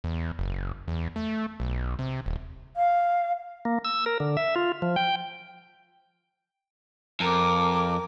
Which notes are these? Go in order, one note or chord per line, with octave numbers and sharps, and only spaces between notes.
E2
F#1
E2
A3
B1
C3
D#1
F5
A#3
E6
A#4
D3
E5
F4
F3
G5
F2 A#4 D6